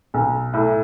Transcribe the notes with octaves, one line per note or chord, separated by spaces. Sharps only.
B1
A2